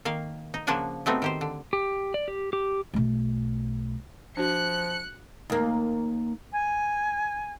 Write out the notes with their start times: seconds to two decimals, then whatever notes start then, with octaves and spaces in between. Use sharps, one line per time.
0.05 D#3 A#3 F5
0.54 D#4
0.67 C#3 F3 A#3 D4 F#5 G#5
1.06 F#3 G3 A3 B3 C4 D#4
1.22 D#3 G4 C5
1.41 D3
1.73 G4
2.14 D5
2.28 G4
2.53 G4
2.94 B1 A3
4.37 F3 D4 F#4 F#6 C#7
5.50 D#2 A#3
6.52 G#5